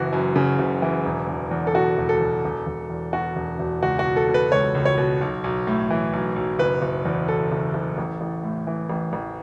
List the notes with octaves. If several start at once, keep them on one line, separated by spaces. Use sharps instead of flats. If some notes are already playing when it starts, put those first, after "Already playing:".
Already playing: F#1 E3 F#4
F#2
C#3
F#1
E3
E1
E1
E2
A4
B2 F#4
E1
A4
E1
E1
E1
E2
B2 F#4
E1
E1
C#2 F#4
F#4
B2
A4
B2
B4
C#2 C#5
C#2
C#5
B2
B1
B1
A2
E3
B1
B1
F#1 B4
F#1
E2
B2 A4
F#1
F#1
A1
A1
A2
E3
A1
A1